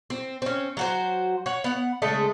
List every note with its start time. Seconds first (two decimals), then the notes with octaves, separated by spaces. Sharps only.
0.10 C4
0.42 C4 C#4
0.77 F#3 F#4 C5
1.46 C#5 F#5
1.64 B3 F#5
2.02 C#3 G#3 A3